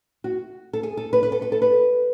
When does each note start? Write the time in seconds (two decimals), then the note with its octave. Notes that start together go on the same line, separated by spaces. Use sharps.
0.24 F#4
0.73 A4
0.83 G#4
0.97 A4
1.13 B4
1.23 B4
1.32 A4
1.42 B4
1.52 A4
1.62 B4